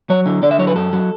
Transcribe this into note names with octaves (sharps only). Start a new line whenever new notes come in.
F#3 C#5
D3
D3 D5
E5
F#3 C#5
B4
F#2 A4
F#3